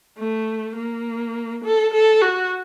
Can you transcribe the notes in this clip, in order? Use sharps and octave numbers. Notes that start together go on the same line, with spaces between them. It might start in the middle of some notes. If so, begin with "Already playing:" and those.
A3
A#3
A4
A4
F#4